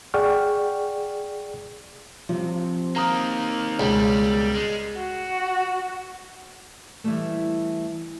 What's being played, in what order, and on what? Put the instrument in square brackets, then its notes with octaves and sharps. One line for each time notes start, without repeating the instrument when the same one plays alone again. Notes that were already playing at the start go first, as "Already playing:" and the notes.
[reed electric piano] G#4 D5 F#5 G5 C#6 F6
[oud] C3 [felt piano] F3
[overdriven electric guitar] D#3 A#3 [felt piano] A#5 D#6
[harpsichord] C#2 [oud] B2 A#3 [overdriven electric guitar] G3
[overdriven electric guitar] G#3
[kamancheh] F#4
[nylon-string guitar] E3 G3 A3